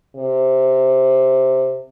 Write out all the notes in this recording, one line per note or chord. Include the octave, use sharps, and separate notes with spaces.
C3